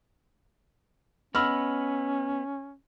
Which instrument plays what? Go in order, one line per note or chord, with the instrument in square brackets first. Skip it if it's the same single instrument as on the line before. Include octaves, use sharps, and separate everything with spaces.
[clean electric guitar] B3 D#5 B5 [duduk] C#4 [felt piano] E6 F6